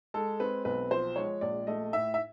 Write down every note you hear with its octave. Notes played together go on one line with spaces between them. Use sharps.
G#3 A4
C4 B4
B1 B4
F3 C5
G#3 C#5
A#1 D5
A3 D#5
A2 E5
E5